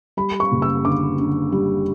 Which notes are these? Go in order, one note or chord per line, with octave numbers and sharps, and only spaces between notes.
G3 B5
C#6
F#1
E6
D3 D6
D3
G3